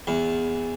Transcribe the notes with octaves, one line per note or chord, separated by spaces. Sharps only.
E2